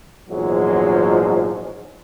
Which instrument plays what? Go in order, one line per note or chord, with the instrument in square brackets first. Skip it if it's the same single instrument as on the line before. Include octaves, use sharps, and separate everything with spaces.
[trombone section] A#1 E2 G#2 F3 F#3 G#3